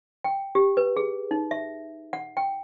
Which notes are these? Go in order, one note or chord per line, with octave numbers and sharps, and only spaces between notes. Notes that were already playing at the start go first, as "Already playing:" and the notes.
G5
G4
B4
G#4
D#4
E5
F#5
G5